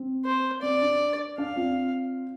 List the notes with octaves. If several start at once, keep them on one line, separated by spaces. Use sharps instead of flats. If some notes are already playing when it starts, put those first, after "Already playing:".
Already playing: C4
C5
C4 D5
D4
D4 F5
C4 F4